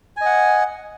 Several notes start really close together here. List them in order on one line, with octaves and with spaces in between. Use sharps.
G#5 D#5 F#5